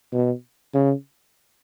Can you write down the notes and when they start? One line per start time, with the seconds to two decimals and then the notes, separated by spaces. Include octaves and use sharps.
0.13 B2
0.74 C#3